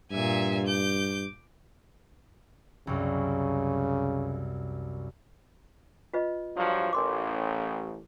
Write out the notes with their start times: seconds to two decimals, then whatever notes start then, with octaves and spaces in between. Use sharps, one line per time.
0.11 G2 A#2 E5 G#5
0.67 D6 G6
2.87 C2 F#2 C#3
6.14 F4 B4 D#5
6.56 G2 F3 F#3
6.93 A1 A#4 C6 D6